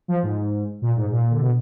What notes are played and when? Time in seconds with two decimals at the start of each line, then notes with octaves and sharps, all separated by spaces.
0.08 F3
0.23 G#2
0.82 A#2
0.96 G#2
1.11 A#2
1.30 D3
1.41 B2